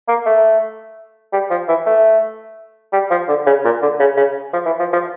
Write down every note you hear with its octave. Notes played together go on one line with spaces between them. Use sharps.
A#3
A3
G3
F3
E3
A3
G3
F3
D3
C#3
A#2
D3
C#3
C#3
F3
E3
F3
F3